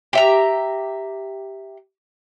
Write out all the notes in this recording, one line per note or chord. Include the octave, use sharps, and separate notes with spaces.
G4 E5 A#5